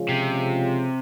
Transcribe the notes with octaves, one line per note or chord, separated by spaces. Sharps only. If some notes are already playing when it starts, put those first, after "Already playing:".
Already playing: C#3 F3 G#3 C#4 F4
C3